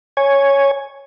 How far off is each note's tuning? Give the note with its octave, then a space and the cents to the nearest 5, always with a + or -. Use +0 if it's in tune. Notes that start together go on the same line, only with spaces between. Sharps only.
C#5 +0 G#5 +0